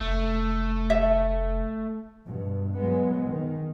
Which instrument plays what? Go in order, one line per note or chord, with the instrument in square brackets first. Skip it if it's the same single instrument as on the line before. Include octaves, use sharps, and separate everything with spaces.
[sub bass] F1 [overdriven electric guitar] A3
[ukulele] E5
[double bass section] G2 B2
F#3 G#3 B3
D#3